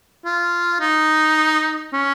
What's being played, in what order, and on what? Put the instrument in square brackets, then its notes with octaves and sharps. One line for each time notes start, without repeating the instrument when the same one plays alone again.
[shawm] F4
D#4
C#4